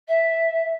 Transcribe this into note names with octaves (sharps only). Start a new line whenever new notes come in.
E5